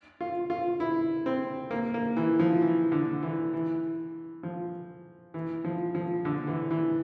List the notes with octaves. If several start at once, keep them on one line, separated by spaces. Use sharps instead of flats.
F4
F4
E4
C4
A#3
A#3
E3
F3
E3
D3
E3
E3
F3
E3
F3
F3
D3
E3
E3